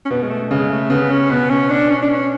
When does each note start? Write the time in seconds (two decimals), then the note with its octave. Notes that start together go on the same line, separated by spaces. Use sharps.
0.05 C#4
0.10 B2 B3
0.23 G#3
0.30 A3
0.51 C#3 G#3
0.71 A3
0.90 C#3 B3
1.10 C#4
1.30 B2 B3
1.50 C#4
1.70 D4
1.90 C#4
2.02 D4
2.09 C#4